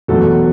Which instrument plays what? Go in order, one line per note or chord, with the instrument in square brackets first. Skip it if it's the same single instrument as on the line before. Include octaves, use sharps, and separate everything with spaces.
[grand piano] E2 B2 F#3 A3 A4